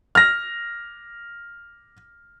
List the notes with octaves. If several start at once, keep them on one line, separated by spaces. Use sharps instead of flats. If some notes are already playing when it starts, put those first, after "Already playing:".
F6 A#6